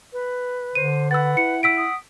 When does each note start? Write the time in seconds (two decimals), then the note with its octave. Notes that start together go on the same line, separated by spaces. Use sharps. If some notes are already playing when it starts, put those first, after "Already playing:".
0.13 B4
0.75 D3 C5 D#7
1.11 B4 F#5 E6 A6
1.37 E4 C#7
1.63 F#5 E6 B6 D7
1.77 D#6